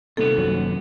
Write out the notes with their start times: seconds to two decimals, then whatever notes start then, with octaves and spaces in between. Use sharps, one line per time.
0.17 D#1 D#2 C3 B3 A4
0.38 F#2 F#3